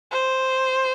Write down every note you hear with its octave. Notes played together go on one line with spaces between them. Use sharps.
C5